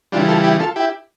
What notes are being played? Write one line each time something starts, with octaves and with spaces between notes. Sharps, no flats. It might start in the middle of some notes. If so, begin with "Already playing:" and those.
C#3 E3 G3 D4 F4
F4 A4
E4 G4
F4 A4
E4 G4